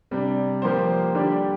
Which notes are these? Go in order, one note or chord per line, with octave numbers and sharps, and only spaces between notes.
C3 G3 D4
F3 A#3 G4 C5
D3 G3 D4 G4 D5